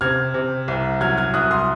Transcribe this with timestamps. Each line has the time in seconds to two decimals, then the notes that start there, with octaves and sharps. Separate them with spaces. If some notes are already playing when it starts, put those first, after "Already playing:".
0.01 C3 F6 G#6
0.34 C3
0.68 C2
1.01 F#3 F6 G#6
1.18 F6 G#6
1.34 C2 D#6 F#6
1.51 C6 D#6